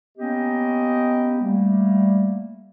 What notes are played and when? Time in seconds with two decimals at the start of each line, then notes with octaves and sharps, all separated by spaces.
0.18 A#3 B3 C#4 G4 D#5 G5
1.41 G3 A3 A#3